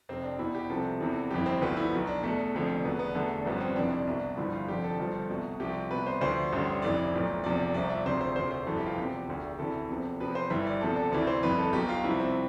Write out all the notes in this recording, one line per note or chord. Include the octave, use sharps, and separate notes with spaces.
F1 F2 C3 C4
D4
E2 B2 E4
G4
C2 C3 F3 A4
E2 C3 E3
G1 F2 E3 G4
C4
D2 D3 F3 B3
E4
B1 B2
D4
E2 B2 A3
F1 F2 D3 F3
E1 E2 B2 B3
B3
E1 E2 D3 A3
A1 G2 F3 B3
C4
G1 F2 C3 E3 D4
C2 B2
G1 G2 D3 F3 E4
F4
F1 F2 D3 F3 G4
A4
G1 G2 F3
C2 B2
C2 C3 F3 G4
C2 B2 B4
C5
D2 D3 F3 C5
A1 G2 D3
F1 F2 E3 D5
B1 A2 F3
F1 E2 C3 F3 D5
C2 C3 F3 D5
E5
E1 D2 C3 F3 C5
C5
E1 D2 C3 C5
C5
G1 F2 C3 E3 A4
G4
F4
E2 C3 F3 G4
E1 D2 D3
D2 C3 E3 A4
E2 C3 F3
E2 C3 F3 B4
C5
G1 G2 E3 E5
D5
E1 E2 C3 F3 A4
A4
D2 C3 E3 D5
C5
G1 F2 E3 B4
A4
B1 B2 G4
F4
C2 C3 F3 E4
C4